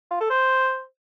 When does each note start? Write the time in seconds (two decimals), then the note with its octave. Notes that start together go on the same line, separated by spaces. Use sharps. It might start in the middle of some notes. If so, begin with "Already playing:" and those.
0.11 F4
0.20 A4
0.30 C5